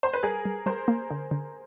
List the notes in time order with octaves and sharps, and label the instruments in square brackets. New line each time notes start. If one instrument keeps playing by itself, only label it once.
[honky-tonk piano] C5
B4
[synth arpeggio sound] G3 [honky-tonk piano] G#4 A#4
[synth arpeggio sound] G3
[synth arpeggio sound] G3 [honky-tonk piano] A#4 C5
[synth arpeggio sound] A#3
D3
D3